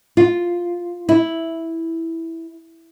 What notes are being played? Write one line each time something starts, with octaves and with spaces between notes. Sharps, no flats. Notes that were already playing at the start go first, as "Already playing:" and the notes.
F4
E4